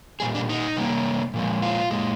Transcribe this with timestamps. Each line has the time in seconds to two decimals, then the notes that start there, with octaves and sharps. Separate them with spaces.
0.20 A#2 G3 G#4
0.35 D4
0.49 D#4
0.77 C3 G3 A#3
1.34 A#2 F3 G#3
1.62 F4
1.90 A#2 G#3